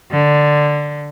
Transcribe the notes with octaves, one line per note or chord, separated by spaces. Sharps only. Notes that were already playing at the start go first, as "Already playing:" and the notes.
D3